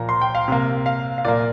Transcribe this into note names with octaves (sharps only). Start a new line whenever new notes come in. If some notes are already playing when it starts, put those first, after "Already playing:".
Already playing: A#2 F3 A#3 A#5
C6
G5
F5
C3 A#3
F5
F5
A#2 A#3 D5